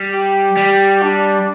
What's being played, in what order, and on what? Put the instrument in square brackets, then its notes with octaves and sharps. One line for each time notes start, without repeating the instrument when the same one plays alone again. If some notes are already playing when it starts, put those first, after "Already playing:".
Already playing: [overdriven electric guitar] G3
[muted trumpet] G4
[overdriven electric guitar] G3
[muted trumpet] D4